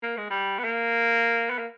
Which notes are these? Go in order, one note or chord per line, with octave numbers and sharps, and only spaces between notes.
A#3
G#3
G3
B3
A#3
B3
A#3